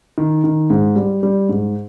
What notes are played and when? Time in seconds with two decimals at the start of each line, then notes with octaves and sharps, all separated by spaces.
0.18 D#3
0.44 D#3
0.70 G#2
0.96 G3
1.23 G3
1.49 G#2